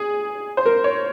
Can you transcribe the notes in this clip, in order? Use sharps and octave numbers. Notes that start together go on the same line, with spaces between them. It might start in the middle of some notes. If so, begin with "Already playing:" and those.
Already playing: G#4
C5
A#4
C#5